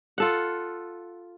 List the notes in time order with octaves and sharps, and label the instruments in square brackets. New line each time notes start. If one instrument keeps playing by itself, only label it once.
[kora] F4 A4 F#5